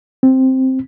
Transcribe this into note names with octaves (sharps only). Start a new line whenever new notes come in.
C4